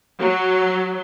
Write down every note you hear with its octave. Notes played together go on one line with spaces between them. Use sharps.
F#3